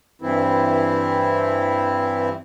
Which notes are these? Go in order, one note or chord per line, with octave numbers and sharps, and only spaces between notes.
G2 E3 C4 E4